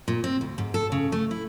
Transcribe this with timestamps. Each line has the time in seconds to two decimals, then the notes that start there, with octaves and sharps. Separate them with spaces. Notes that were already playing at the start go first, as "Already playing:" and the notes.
0.08 A#2
0.24 C4
0.41 D2
0.58 G#2
0.74 A4
0.92 C#3
1.12 A3
1.31 E4